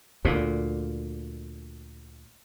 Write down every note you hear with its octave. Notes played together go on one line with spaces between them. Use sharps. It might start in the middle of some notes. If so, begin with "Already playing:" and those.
D2 A#2